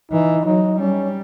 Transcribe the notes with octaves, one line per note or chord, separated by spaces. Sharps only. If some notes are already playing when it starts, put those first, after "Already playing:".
E3 D#4
F#3 D#4
G3 C#4